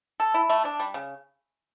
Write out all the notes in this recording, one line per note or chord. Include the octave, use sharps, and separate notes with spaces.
A4
E4
A3
D4
G3
C#3